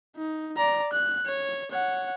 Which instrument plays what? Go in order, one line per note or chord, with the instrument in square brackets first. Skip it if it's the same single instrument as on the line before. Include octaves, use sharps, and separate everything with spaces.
[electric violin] D#4
D5 A#5
F#6
C#5
C#5 F#5